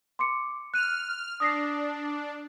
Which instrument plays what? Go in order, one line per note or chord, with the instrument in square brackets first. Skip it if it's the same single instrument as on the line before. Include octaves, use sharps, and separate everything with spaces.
[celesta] C6 D6 C#7
[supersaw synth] F6 [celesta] F#6 D#7
[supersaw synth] D4 [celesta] D#6 A#6 C7